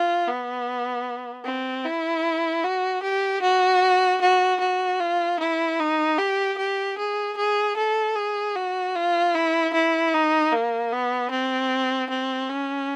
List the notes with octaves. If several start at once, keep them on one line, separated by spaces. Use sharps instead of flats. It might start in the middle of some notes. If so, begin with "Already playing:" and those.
Already playing: F4
B3
C4
E4
F#4
G4
F#4
F#4
F#4
F4
E4
D#4
G4
G4
G#4
G#4
A4
G#4
F#4
F4
E4
E4
D#4
A#3
B3
C4
C4
C#4